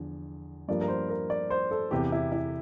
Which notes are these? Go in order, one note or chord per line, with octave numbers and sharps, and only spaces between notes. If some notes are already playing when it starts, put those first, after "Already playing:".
Already playing: E2 D3 F3
G2 F3 A#3 D5
A#4
C5
A#4
D5
C5
A4
E2 C3 E3 G4
E4
E4